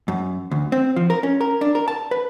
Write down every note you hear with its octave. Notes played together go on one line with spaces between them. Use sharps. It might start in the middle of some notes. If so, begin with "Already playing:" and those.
F#2
D2
C4
F3
A#4
C#4
A#4
D4
A#4
A5
B4